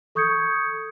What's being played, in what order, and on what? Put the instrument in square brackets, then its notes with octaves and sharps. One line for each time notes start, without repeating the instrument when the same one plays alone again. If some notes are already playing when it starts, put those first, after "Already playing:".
[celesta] A4 C#6 D#6 G6 G#6 C#7